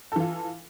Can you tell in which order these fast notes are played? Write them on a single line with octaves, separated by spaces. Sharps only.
A4 E3 F4